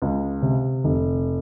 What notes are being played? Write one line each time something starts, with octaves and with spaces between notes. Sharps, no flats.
C#2
C3
F1